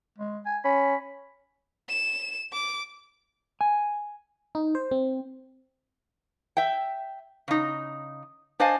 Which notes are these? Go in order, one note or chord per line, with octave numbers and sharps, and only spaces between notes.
G#3
G#5
C#4 B5
E7
D6
G#5
D#4
C5
C4
E5 G5
C#3 D#4
D4 C5 D#5 F5 G#5 A5